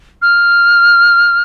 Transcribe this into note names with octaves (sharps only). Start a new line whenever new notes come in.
F6